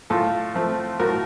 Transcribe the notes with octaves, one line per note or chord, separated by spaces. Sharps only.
A2 F4 A4
F3 A3 C4
A2 F#4 A#4